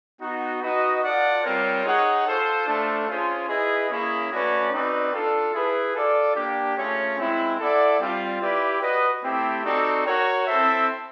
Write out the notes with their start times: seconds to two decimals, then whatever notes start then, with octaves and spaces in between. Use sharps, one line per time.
0.21 B3 D#4 F#4
0.63 D#4 F#4 B4 D#5
1.03 F4 A4 D5 F#5
1.43 G3 C4 F4 A#4 C#5
1.85 D#4 G#4 C#5 F#5
2.26 F4 A4 C5
2.67 A3 D4 F4 A4 C5
3.08 C#4 F4 G#4 C5
3.49 E4 G#4 B4 D#5
3.90 A#3 C#4 E4 G#4
4.31 A3 C#4 F#4 B4 D5
4.72 C4 D#4 F#4 B4 D5
5.13 D4 F4 A4
5.54 E4 G#4 B4
5.95 F4 A4 D5
6.36 A#3 D4 G4
6.77 A3 C#4 F4 G#4 C#5
7.18 G#3 C4 E4
7.59 E4 A4 D5 F#5
8.00 G3 C4 F4
8.42 E4 G4 B4 D5
8.82 F#4 B4 D#5
9.23 A3 C4 E4 G4
9.64 C4 D#4 F#4 A4 D5
10.06 F#4 A#4 C#5
10.46 C4 E4 A4 C5 E5